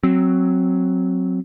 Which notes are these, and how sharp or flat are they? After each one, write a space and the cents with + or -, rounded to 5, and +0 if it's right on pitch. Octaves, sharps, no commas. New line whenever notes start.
F#3 +0 C4 +5